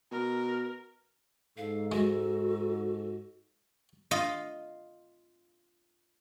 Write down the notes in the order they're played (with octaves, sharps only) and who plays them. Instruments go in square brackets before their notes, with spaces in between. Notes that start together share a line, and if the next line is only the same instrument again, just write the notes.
[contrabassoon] B2 [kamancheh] A#4
[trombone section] G#2 [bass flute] A4 [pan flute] F5
[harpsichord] G#3 [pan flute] F#4
[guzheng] F4 D#5